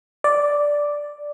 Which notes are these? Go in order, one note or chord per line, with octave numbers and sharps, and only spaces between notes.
D5